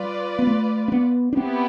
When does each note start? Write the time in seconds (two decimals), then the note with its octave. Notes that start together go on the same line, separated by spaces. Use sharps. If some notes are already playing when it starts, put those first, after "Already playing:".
Already playing: G3 F4 B4 D5
0.39 B3
0.47 A3
0.88 C4
0.92 B3
1.33 D4
1.37 B3 C4 E4 G4